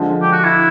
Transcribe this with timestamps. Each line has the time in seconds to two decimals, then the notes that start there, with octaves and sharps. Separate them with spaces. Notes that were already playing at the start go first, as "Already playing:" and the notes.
Already playing: D3 F3 G#3
0.22 G4
0.32 F#4
0.44 E4